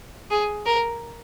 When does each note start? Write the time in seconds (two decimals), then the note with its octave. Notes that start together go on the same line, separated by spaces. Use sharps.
0.31 G#4
0.66 A#4